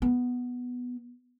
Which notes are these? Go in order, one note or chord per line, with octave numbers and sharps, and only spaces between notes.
B3